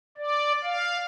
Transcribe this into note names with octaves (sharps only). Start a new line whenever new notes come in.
D5
F5